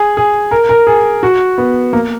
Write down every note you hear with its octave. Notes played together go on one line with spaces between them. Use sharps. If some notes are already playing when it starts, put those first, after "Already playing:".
Already playing: G#4
G#4
A#4
A#4
G#4
F#4
B3
A#3